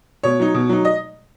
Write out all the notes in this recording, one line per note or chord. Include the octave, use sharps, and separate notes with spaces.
B2 C#5
F#3 D#4
B2
F#3 D#4
D#5